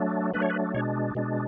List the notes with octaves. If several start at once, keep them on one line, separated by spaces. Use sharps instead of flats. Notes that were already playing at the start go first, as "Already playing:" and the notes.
Already playing: F#3 A3 D4
F#3 A3 D4 B4
C#5
B4
B2 G#3 D4 C#5
B2 G#3 D4